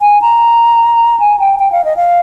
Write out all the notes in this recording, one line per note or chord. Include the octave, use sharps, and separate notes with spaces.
G#5
A#5
G#5
G5
G5
F5
D#5
F5